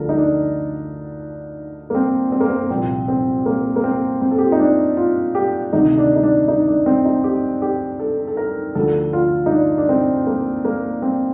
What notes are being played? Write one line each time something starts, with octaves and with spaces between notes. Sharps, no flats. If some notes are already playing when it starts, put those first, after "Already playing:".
Already playing: D2 D3 F3 A4 A#4
D#4
D4
A#3
C4
C4
A#3
C4
C2 A#2 F3 C4
C4
A#3
A#3
C4
C4
A4
G4
F4
D#4
D4
F4
G4
D2 C3 D#3 D#4
D4
D#4
D4
D#4
D4
C4
D#4
G4
G4
A4
A4
A#4
D2 D3 F3 A4
F4
D#4
D4
D4
C4
A#3
A#3
C4